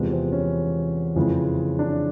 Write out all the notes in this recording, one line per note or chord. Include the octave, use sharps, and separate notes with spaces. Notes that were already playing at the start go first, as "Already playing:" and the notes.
Already playing: E2 C3 F3 G#3 B3
C4
C#4
F2 C#3 E3 G#3
D4